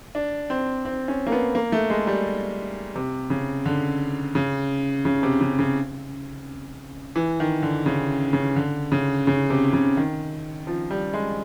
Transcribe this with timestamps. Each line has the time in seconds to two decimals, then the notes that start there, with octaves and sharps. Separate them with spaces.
0.15 D4
0.50 C4
0.85 C4
1.08 C#4
1.27 A#3
1.32 B3
1.55 A#3
1.72 A3
1.90 G#3
2.07 G3
2.95 C3
3.30 C#3
3.66 D3
4.35 C#3
5.05 C#3
5.23 C3
5.41 C#3
5.59 C#3
7.16 E3
7.40 D#3
7.63 D3
7.86 C#3
8.33 C#3
8.56 D3
8.92 C#3
9.27 C#3
9.50 C3
9.73 C#3
9.97 D#3
10.67 F3
10.91 G3
11.14 G#3